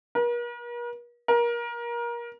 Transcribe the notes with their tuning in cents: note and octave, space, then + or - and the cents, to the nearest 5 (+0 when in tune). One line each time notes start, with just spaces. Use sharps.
A#4 +45
A#4 +25